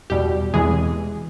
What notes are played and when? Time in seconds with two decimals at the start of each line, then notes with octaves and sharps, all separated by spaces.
0.10 E2 B2 G3 G4
0.53 E2 C3 E3 G#3 G#4